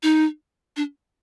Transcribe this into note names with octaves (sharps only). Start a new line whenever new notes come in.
D#4
D4